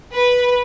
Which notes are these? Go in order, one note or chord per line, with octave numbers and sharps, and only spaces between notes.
B4